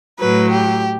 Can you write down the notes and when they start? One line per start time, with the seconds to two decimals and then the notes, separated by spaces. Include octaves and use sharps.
0.20 A2 F#3 B4
0.52 G4